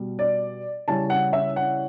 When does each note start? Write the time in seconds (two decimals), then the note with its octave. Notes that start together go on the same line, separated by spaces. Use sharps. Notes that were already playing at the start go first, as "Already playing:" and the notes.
Already playing: B2 G3
0.19 D5
0.88 C#3 G3 C#4 E4 A5
1.10 F#5
1.33 E5
1.56 F#5